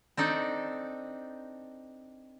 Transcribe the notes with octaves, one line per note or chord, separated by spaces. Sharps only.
C4 D4 D#4 A4